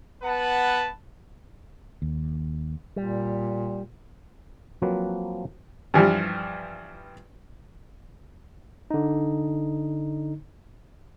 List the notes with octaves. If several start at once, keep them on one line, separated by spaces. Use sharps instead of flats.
B3 B4 F#5 A5
D#2
A#2 G3
F3 F#3 A#3 C4 B4
G2 E3 F3 G3
D3 D#4